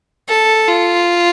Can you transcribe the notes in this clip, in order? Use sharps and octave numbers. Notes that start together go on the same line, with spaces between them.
A4
F4